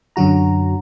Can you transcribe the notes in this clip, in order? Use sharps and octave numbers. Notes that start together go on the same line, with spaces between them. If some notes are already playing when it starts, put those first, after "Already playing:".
F#2 D3 F#3 F#4 A#5